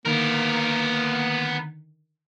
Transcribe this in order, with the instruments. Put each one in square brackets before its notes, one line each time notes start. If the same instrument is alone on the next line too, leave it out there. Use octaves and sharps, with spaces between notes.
[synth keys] D3 D#3 [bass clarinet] A#3 [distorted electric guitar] B3 A#4